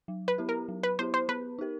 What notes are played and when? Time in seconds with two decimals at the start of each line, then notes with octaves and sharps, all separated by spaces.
0.08 F#3
0.28 B4
0.38 B3 E4 G4
0.49 A#4
0.68 F#3
0.83 B4
0.99 B3 E4 G4 C5
1.14 C5
1.29 B3 B4
1.59 D#4 G4 A#4